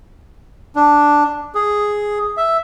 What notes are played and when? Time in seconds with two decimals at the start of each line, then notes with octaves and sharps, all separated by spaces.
0.76 D4
1.55 G#4
2.37 E5